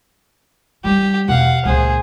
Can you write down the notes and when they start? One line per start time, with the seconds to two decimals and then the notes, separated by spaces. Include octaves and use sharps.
0.84 G3 D#4 G4
1.29 E1 B2 F5 F#5
1.65 C#2 A#2 G#4 C5